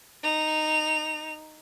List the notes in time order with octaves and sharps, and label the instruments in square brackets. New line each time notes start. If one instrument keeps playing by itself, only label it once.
[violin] D#4 F7